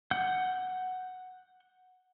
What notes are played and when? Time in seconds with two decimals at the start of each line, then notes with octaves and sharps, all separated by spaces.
0.11 F#5 G6